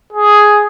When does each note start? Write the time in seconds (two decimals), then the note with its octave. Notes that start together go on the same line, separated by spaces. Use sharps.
0.13 G#4